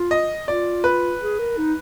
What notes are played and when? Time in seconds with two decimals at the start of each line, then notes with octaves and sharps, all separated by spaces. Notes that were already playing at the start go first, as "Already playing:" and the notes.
Already playing: F4
0.11 D#5
0.48 F4 D5
0.84 B4
1.21 G#4
1.39 A#4
1.57 D#4